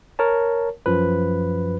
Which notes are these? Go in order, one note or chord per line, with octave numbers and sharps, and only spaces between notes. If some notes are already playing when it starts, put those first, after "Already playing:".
A#4 C#5 A5
F#2 F3 B4